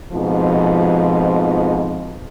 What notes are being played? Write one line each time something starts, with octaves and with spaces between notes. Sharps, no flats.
F2 G#2 B2 F3